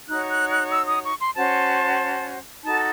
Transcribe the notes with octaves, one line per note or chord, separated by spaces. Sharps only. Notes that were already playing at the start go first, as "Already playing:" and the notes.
D#4 F#4 C#5 F#6
F#6
F#6
E6
D#6
C#6
C6
C#4 F#4 C5 A5
D#4 F#4 A4 A5